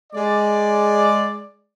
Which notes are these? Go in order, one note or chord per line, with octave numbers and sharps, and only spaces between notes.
G#3 D5